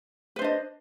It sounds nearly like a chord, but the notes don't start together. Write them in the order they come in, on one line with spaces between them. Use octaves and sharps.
B4 C5 D4 D#5